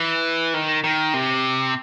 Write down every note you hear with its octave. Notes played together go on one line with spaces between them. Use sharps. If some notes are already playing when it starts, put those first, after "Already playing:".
Already playing: E3
D#3
D#3
C3